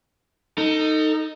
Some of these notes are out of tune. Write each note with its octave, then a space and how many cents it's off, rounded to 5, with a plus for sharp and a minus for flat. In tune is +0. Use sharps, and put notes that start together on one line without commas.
D#4 +0 A4 +30